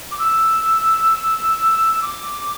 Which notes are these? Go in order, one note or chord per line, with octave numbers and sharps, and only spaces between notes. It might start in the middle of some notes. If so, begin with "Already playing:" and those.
D6
E6
D6